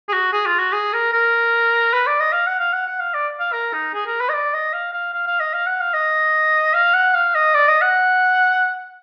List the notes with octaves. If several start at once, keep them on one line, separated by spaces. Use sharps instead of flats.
G#4
F#4
G#4
F4
F#4
G#4
A#4
A#4
B4
D5
D#5
F5
F#5
F5
F#5
F#5
F5
D5
F5
A#4
D#4
G#4
A#4
B4
D#5
D5
D#5
F5
F5
F5
F5
D#5
F5
F#5
F5
D#5
F5
F#5
F5
D#5
D5
D#5
F#5